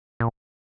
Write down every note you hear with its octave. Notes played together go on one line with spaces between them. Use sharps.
A#2